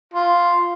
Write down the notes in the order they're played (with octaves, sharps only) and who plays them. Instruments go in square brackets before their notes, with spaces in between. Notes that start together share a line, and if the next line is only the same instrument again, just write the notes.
[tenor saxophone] F4